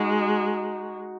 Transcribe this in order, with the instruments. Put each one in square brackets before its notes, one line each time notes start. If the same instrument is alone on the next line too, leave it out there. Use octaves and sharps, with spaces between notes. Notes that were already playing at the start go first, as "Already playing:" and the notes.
Already playing: [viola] G#3 [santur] D#4 F#4